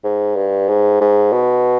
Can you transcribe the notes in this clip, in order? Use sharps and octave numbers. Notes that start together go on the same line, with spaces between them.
G#2
G2
G#2
G#2
B2